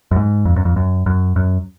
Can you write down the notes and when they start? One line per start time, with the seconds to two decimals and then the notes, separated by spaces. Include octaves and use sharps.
0.11 F#2
0.16 G#2
0.45 F2
0.56 F#2
0.65 F2
0.76 F#2
1.06 F#2
1.36 F#2